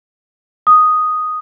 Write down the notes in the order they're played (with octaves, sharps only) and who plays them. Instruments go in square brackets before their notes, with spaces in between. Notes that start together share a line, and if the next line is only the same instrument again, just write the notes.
[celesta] D#6